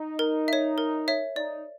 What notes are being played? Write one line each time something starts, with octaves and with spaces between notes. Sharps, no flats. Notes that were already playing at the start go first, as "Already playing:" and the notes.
Already playing: D#4
A#4
C#5 E5
A#4
C#5 E5
D#4 D5